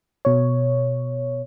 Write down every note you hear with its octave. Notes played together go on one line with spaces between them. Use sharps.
B2 C#5